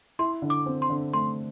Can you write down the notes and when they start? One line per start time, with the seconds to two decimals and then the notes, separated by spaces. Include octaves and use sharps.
0.19 E4 C6
0.42 D3
0.50 D6
0.66 C4
0.82 C6
0.90 D3
1.13 A3 C6